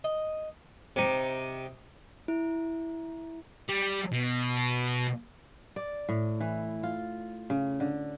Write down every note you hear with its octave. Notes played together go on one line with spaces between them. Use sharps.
D#5
C3 D#4
E4
G3
B2
D5
A2
E3
F4
C#3
D3